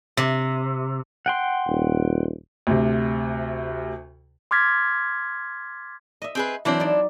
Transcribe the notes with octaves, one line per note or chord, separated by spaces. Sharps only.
C3
F#5 G5 C6
D#1
D2 C3
C6 D6 F6 G#6 A6 B6
D#5 E5
C4 G#4 B4
E3 F#3 C4 D4 E4
D#4 D5